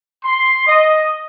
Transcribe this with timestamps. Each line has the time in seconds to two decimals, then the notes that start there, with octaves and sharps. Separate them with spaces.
0.23 C6
0.67 D#5